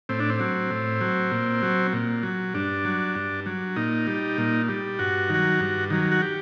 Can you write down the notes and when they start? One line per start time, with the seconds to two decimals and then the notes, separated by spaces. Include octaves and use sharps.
0.09 A2 C4
0.20 D4
0.30 C4
0.40 F#3
0.71 A2
1.01 F#3
1.31 A#2
1.63 F#3
1.93 A#2
2.23 F#3
2.54 G2 D4
2.85 F#3
3.15 G2
3.46 F#3
3.76 A#2 D#4
4.07 G3
4.38 A#2
4.69 G3
4.99 G2 F#4
5.29 D#3
5.34 F#3
5.60 G2
5.90 D#3 F#3
6.12 F#4
6.22 G4